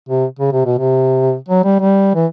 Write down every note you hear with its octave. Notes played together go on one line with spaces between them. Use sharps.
C3
C#3
C3
B2
C3
F#3
G3
G3
E3